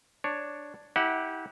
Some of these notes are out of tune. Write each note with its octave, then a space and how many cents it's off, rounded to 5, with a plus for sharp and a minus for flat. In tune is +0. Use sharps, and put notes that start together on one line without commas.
D4 +0 C#5 +0
E4 -35 G4 +0 F#5 +0